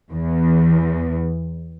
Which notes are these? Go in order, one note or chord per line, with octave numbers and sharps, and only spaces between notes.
E2